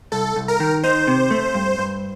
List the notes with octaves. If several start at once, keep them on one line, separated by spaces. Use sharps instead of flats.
C2 A4
C2
A#4
D#3
D#4 C5
C3
A3
G2
G2